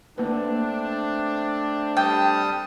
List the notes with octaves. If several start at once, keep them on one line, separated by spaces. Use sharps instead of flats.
A3 A#3 C4 D4 B4
G3 G5 A5 D#6